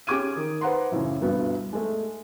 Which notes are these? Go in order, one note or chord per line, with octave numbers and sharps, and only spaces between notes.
C#4 G4 G#4 D6 G#6 D#7
D#3 D#6
B4 C5 F#5 A#5 C6
F#2 A2 C#3 E3
G1 D2 G2 B2 B3
G#3 A3